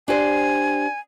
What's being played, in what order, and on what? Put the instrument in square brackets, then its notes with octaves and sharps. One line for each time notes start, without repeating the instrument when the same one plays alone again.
[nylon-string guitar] D4 G4 C5 [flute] G#5